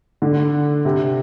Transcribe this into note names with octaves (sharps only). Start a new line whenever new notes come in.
D3
C3